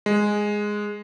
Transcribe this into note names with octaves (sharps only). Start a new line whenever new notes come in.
G#3